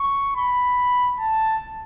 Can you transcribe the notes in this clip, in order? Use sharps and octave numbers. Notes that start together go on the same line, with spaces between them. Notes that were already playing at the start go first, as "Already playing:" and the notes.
Already playing: C#6
B5
A5